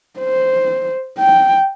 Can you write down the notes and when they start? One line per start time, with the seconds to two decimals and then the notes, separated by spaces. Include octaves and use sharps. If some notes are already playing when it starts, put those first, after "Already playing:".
0.20 C5
1.18 G5